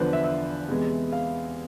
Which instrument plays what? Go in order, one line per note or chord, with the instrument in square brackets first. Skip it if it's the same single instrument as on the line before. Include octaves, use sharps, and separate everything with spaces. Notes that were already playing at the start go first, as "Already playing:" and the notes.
Already playing: [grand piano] E2 D3 F3 B4 C5
E5
E5
E2 C3 G#3 B3
F5